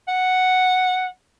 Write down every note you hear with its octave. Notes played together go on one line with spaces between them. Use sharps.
F#5